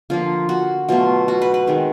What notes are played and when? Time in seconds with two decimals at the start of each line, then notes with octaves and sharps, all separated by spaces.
0.10 D3 F3 A#3 F4
0.49 F#4
0.88 B2 F#3 A3 F4
1.28 F#4
1.42 B4
1.54 B4
1.67 D#3 G#3 C4